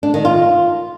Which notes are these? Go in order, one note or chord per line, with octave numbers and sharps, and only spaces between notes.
D4
D#3
F4